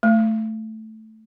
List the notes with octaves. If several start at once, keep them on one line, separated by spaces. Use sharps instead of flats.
A3